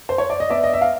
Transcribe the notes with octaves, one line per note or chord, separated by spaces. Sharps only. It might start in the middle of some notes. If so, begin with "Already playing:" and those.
C5
C#5
D5
D#5
B3 D5 E5
D#5
E5
F5